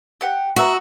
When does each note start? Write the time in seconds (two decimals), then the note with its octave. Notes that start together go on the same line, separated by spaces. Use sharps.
0.21 G4 F#5
0.56 B3 F#4 E5 A#5